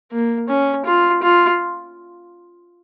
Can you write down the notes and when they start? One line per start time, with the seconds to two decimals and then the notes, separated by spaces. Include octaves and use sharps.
0.12 A#3
0.48 C#4
0.85 F4
1.23 F4